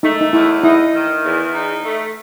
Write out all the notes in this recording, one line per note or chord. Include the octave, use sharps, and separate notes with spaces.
A3 D#4
D#4
E2 E4
D#4 E4
D#3
E2
D#4
A3